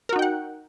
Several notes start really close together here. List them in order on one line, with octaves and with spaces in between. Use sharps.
A#4 F#4 D#4 G5 F#5